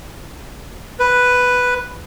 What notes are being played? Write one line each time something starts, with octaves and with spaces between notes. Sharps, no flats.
B4